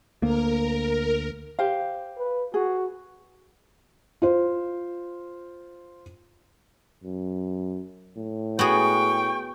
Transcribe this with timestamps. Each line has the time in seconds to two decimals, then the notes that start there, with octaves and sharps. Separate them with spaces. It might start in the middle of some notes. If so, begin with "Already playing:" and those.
0.22 D2 A#3 A#4
1.59 G4 C5 F5
2.18 B4
2.54 F#4 G#4
4.22 F4 C5
7.03 F#2
8.17 A2
8.59 B3 F#4 G#4 G5 C#6